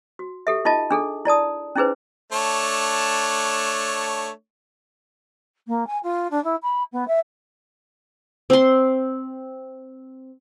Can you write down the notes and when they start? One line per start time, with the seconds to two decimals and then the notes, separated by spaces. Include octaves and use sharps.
0.19 F#4
0.47 G4 A4 E5
0.65 D#4 F4 D#5 A5
0.91 D4 G#4 A4
1.25 E4 D5 A5 D#6
1.76 C#4 D#4 E4 G#4 B4 C5
2.32 A3 D4 C#5
5.67 A#3
5.87 G#5
6.03 F4
6.31 D4
6.44 E4
6.62 B5
6.92 B3
7.08 E5
8.50 C4 C6